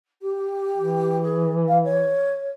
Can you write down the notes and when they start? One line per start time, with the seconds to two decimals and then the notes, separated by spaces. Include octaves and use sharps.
0.22 G4
0.77 E3
1.22 G#4
1.67 F5
1.84 C#5